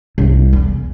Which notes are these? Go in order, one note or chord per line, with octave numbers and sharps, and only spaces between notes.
C2
E2